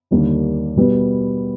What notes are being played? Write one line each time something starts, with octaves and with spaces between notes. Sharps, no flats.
D#2 D3 G3 A#3 D4
B2 G3 B3